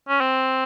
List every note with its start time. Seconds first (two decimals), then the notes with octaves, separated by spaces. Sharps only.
0.09 C#4
0.21 C4